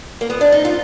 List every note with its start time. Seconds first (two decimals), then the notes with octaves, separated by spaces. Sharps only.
0.21 A#3
0.30 G#2 F3 B3
0.41 D4
0.52 D#4
0.65 F4